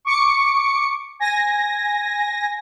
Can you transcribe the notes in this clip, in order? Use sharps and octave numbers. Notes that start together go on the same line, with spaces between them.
C#6 D6 C#7
G#5 A#6